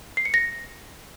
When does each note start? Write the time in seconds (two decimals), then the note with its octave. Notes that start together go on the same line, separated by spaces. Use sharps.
0.17 C7
0.25 C#7
0.34 A#6